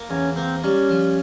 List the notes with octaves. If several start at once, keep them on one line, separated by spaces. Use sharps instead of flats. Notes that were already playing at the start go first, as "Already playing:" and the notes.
Already playing: A#3
E2 C#4
A#3 C4
G3 C#4
F3